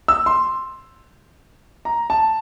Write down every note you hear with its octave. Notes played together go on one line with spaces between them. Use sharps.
E6
C6
A#5
A5